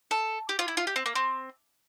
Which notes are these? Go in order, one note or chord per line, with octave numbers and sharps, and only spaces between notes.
A4
G4
F4
E4
F4
G4
C4
A#3
C4